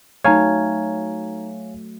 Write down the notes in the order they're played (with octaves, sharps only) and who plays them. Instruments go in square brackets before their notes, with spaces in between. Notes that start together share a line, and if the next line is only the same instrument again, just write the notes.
[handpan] F#3 A3 [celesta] D#4 A#5 G#6 [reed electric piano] C#5 F5 G#5